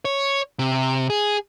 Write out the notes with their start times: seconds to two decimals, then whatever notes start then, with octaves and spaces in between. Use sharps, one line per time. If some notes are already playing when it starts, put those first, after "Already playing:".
0.05 C#5
0.59 C3
1.10 G#4